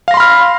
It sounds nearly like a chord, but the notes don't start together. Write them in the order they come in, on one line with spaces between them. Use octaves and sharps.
F5 A#6 C6 B5 F6